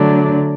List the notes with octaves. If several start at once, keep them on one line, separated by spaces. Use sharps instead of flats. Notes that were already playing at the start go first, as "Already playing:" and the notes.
Already playing: D3 F#3 A3 D4